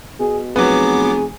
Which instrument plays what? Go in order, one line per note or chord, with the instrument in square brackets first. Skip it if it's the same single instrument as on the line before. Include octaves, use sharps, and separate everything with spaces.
[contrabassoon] B2 [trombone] G#4
[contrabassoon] F1 [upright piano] F#3 B4 [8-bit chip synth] B3 D6 [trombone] G#4